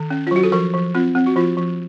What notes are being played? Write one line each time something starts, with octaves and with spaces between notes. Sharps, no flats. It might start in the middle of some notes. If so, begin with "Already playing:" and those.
Already playing: D#3
C#4
F4
F#3 F#4
A4
F3 A#4
F3
C4 F4
C4
F#4
F3 F4
F3